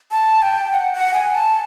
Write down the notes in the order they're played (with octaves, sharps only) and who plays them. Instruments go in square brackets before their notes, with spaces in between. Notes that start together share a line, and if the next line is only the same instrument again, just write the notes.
[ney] A5
G5
F#5
F#5
G#5
A5